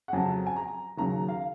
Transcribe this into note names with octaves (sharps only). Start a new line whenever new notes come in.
F#5
F2 C#3 F#3 G#5
G#5
A#5
D#2 C#3 F#3 A#5
F5